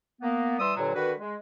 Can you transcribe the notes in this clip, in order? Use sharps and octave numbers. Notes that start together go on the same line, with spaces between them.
A#3 B3
E3 G3 C6 D#6 E6
G2 A#2 D3 F#3
D3 D#3 F#4 B4
G#3